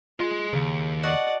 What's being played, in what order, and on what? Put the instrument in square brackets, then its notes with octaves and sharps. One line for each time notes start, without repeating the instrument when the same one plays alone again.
[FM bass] F4 [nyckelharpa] G#4 [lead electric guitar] D#5 C6
[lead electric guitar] D#2 [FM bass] C#3
[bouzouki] F#4 D#5 A5 [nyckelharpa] D5 F#5